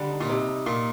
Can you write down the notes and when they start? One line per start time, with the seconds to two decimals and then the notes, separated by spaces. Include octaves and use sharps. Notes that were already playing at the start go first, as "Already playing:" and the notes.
Already playing: D3 G3
0.10 D#4
0.20 A#2
0.29 C3 D#4
0.48 D#4
0.66 A#2 A#3